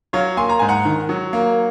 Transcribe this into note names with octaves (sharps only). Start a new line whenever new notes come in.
F#3 C#5 F5
A#3 G#5 C6
A#5
G#2 G#5
F#5 A#5
D#3
F#3
A#3